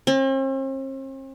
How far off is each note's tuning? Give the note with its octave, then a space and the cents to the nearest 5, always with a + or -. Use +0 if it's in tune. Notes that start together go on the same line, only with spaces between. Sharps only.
C4 +45